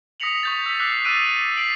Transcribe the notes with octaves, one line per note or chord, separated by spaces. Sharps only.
D#6 A#6 B6 C#7 F7 F#7
C#6 G6 A6
E6 B6
D6 E6 F#6 B6 C7
D#6 E6 F#6 A6 D7 D#7
B6 C7 D7 F#7